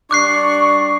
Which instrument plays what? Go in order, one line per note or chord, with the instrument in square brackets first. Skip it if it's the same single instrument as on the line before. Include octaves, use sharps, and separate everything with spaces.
[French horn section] G3 D4 [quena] C#6 [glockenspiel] D6 F#6 C7